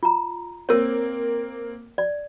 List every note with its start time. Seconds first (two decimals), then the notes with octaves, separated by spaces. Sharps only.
0.03 F4 A#5
0.69 A#3 C4 A#4 C#5
1.98 D5